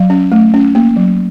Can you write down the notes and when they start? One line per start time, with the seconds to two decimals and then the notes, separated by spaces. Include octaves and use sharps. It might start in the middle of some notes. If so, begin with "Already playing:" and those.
Already playing: F#3 F5
0.10 C#4
0.32 A3
0.54 C#4
0.75 A#3
0.96 F#3